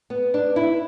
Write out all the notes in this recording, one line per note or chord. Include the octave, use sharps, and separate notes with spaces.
B3 B4
D4
E4